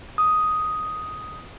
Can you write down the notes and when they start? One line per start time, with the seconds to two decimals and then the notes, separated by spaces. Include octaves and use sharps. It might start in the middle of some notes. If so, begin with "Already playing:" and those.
0.18 D#6